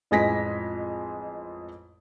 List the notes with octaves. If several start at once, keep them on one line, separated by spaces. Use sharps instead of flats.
A1 F2 G#3 G#5 A#6 B6